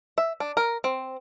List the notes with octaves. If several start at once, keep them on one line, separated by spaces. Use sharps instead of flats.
E5
D4
A#4
C4